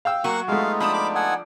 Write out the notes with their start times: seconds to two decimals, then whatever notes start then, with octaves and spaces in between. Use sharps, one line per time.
0.05 F5 G5 E6
0.24 F#3 A#3 F#4 F#5 C#6
0.48 G#3 A3 B3 D#4 F4 F5
0.80 F3 D4 A4 A5 B5 D#6
0.93 B5 D6
1.15 A4 F#5 G#5